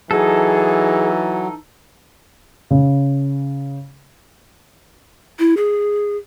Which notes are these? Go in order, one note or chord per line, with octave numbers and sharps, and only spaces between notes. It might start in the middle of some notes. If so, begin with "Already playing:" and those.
E3 F#3 D#4 G#4 A4
C#3
E4
G#4